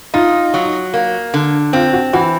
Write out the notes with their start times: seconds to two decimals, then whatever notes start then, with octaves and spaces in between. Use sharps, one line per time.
0.14 D#4 F4
0.54 F#3
0.94 A#3
1.34 D3
1.73 C4 F4
1.93 F#4
2.13 E3 F#4